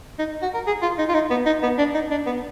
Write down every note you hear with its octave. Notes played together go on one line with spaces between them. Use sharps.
D#4
F#4
A#4
G#4
F4
D#4
F4
D#4
B3
D#4
B3
D4
D#4
D4
B3